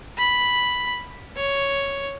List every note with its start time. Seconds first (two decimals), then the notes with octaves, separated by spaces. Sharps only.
0.17 B5
1.36 C#5